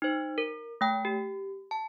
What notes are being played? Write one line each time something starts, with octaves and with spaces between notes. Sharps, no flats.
D#4 C5
A#4
A3 G5
G4
A5